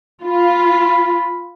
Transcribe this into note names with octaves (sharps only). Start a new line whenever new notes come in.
F4 B5